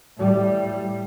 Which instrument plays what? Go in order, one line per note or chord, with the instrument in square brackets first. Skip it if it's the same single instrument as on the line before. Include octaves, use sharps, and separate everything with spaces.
[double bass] A2 G3